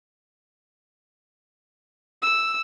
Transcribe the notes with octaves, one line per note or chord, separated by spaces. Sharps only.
E6